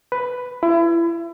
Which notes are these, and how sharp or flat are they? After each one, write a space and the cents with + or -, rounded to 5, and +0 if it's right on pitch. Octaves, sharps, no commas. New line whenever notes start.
B4 +5
E4 +30